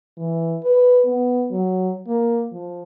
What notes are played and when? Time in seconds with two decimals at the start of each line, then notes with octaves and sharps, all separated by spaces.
0.17 E3
0.64 B4
1.06 B3
1.51 F#3
2.08 A#3
2.52 F3